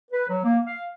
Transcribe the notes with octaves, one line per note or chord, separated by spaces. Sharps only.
B4
F#3
A#3
F5